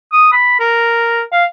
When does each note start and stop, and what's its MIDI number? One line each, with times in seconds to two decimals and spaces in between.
0.12 0.30 87
0.33 0.58 83
0.60 1.22 70
1.32 1.45 77